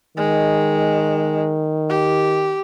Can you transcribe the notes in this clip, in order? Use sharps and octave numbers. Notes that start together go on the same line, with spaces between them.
D#3 G#3
G4